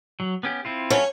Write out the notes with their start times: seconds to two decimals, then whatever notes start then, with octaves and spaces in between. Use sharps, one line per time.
0.20 F#3
0.43 B3 C#4 G4
0.65 C4 E4 F4
0.90 F#3 A3 C#4 C#5